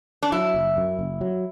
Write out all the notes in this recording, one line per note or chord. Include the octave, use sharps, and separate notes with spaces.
D4
F#3 E4
F#1
F#2
F#1
F#3